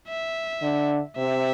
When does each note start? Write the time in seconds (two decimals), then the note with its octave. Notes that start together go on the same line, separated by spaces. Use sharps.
0.08 E5
0.62 D3
1.17 C3 E5